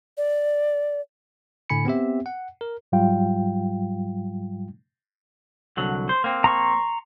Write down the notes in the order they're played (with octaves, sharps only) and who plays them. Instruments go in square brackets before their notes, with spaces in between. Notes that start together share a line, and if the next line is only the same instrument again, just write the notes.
[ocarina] D5
[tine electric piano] A2 D3 G#5 B5 C#7
B3 C4 G4 E5
F#5
A#4
[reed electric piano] G#2 F#3 G3 F4 F5 G5
[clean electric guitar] C2 D3 F#3
C5
A#3 C4
[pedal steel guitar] A#5 C6 C#6